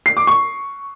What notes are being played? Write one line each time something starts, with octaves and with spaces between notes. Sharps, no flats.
C7
D6
C#6